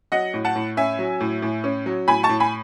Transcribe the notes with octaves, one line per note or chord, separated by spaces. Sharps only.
F#3 D#5 F#5
A2
F#5 A5
A2
C#4 E5 G#5
F#3
A2
A2
C#4
F#3
A2 G#5 B5
A5 C#6
A2
G#5 B5